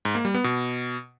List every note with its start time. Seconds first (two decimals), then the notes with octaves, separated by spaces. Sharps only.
0.05 G#2
0.15 A#3
0.25 G3
0.35 B3
0.44 B2